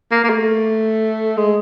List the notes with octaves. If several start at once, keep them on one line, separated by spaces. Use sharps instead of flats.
A#3
A#3
A3
G#3